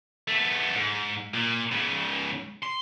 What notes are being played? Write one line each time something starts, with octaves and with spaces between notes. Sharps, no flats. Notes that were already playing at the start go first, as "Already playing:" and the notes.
A3 B3
G#2
A#2
G#2 C#3
C6